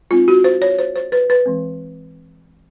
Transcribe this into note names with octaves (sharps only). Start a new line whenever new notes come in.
G#3 C4 D#4 F4
F#4
C5
C#5
C5
C5
B4
B4
E3 G#3 C4